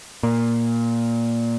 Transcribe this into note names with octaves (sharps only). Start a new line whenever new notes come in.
A#2